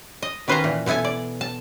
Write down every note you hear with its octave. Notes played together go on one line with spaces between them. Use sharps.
D#5
D#3 C#4 B4 C5 F5 A#5
A#2 E3
B2 B3 E4 A4 G#5
D5
A5